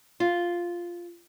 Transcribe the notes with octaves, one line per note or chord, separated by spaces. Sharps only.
F4